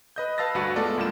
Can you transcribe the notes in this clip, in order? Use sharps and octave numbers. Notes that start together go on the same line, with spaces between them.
B4 D#5 G6
B4 F5 A5 E6 A6 A#6
D2 G2 F#4 B4 A#6 C#7
G#3 A3 B3 F4 A4 D5
C#2 G2 A#3 F4 E7